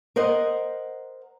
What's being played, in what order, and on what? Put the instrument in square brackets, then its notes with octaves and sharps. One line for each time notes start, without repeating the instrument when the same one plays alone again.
[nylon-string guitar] A#4 C5 D#5 F#5